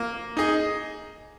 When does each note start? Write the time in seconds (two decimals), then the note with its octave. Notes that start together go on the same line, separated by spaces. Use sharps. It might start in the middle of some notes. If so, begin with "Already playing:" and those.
Already playing: A#3
0.37 D#4 G#4 D#5